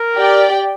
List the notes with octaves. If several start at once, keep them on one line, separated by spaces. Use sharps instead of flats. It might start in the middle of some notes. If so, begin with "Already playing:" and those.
Already playing: A#4
G4 D5 G5